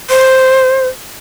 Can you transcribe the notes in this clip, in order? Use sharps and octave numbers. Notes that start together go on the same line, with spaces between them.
C5